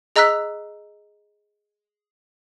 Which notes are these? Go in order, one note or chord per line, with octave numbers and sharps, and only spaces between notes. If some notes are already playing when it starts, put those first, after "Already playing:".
G#4 D#5 A#5 E6 F#6 B6